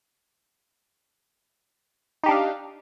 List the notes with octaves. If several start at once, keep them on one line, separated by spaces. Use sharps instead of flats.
D4 D#4 G4 F5